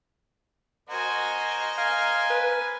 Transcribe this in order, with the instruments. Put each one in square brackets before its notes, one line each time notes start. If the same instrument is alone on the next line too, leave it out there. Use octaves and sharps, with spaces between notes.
[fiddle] F#4 G#5 [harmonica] A#4 C5 D#5
[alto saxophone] F5 [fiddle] G#5
[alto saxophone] B4